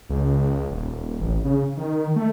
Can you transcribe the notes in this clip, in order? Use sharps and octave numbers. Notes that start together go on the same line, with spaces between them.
C#2
D#1
A1
C#3
D#3
A3